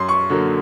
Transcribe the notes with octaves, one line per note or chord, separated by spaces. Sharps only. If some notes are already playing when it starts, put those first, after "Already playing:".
Already playing: F#2 C6
C#6
D3 F#3 A#3